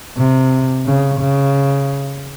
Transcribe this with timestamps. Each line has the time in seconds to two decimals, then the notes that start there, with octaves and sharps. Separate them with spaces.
0.17 C3
0.85 C#3
1.20 C#3